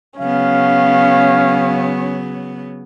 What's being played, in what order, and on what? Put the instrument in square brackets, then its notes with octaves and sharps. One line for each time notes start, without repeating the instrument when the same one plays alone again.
[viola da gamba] C#3 F#3 B3 [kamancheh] C#4 [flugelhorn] F5